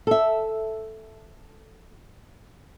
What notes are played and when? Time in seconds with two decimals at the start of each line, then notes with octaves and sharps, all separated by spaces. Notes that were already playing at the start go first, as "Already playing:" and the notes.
0.07 A4 E5